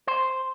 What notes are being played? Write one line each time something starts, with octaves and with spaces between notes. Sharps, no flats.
C5